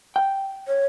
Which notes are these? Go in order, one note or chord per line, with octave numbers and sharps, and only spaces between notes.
G5
C#5